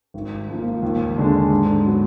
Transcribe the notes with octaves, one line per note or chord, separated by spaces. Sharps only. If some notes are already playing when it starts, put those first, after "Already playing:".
G#1
G#2 F3 A#3
D#2
D3 G#3 D4
G#2
F#3 B3